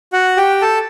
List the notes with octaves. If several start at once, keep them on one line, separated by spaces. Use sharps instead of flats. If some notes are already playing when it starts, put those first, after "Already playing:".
F#4 F#5
G4 G5
A4 A5